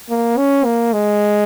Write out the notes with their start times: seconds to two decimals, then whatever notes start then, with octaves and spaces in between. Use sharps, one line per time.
0.10 A#3
0.37 C#4
0.65 A#3
0.93 G#3